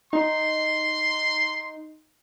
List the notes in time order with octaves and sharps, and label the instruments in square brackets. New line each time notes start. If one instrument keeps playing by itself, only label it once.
[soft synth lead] D#4 [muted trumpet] C6